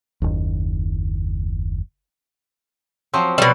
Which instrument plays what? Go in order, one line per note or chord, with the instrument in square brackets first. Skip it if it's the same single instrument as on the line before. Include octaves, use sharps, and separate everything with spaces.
[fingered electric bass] F#1 D#2
[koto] F3 F#3 C4
[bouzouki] B2 G3 [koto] F#3